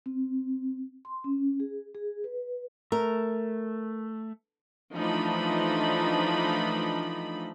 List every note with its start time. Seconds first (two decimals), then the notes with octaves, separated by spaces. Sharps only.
0.06 C4
1.05 C6
1.24 C#4
1.60 G#4
1.95 G#4
2.24 B4
2.92 A3 A#4
4.93 E3 F3 A3 D4 D#4 B5